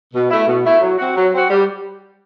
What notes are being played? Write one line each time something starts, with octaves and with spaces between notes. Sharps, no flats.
B2
A3 E4
B2
A3 E4
F#3
C4 F#4
F#3
C4 F#4
G3